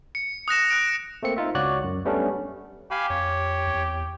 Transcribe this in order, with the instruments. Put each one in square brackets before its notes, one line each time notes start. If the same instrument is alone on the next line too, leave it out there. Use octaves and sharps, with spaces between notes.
[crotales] C#7
D#6 F#6 A#6 E7
F#6 D7
[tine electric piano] A3 A#3 C4 C#7
D#4 F4 E5
C#2 F#4 C#5 D5 F#6
F#2
G3 A3 B3 C#4 D4
[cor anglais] G4 [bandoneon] F5 G#5 B5
[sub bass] F2 [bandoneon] C#5
[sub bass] E2